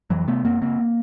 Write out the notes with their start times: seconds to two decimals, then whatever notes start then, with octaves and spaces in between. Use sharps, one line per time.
0.10 F2 E3 F#3
0.27 C3 A3 B3
0.44 F#2 A#3 C4
0.62 C#3 A#3 C4